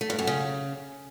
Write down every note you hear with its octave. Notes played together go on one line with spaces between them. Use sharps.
A3
G2
F#2
C#3